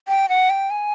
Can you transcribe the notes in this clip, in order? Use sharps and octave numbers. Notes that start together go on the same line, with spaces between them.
G5
F#5
G5
G#5